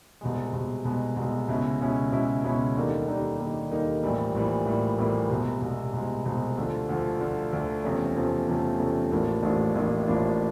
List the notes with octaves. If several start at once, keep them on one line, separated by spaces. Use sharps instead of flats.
C2 B2 G#3
C2 B2 G#3
C2 B2 G#3
C2 B2 G#3
C#2 B2 G#3 C#4 E4
C#2 B2 G#3 C#4 E4
C#2 B2 G#3 C#4 E4
C#2 B2 G#3 C#4 E4
D#2 D3 G3 A#3 D#4
D#2 D3 G3 A#3 D#4
D#2 D3 G3 A#3 D#4
D#2 D3 G3 A#3 D#4
A#1 A2 E3 G3 A#3
A#1 A2 E3 G3 A#3
A#1 A2 E3 G3 A#3
A#1 A2 E3 G3 A#3
C2 B2 G#3
C2 B2 G#3
C2 B2 G#3
C2 B2 G#3
D2 D3 F3
D2 D3 F3
D2 D3 F3
D2 D3 F3
E2 C3 F3 A3 C#4
E2 C3 F3 A3 C#4
E2 C3 F3 A3 C#4
E2 C3 F3 A3 C#4
A1 A2 F3 A#3 D4
A1 A2 F3 A#3 D4
A1 A2 F3 A#3 D4
A1 A2 F3 A#3 D4